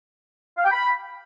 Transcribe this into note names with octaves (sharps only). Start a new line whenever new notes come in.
F5
G5
B5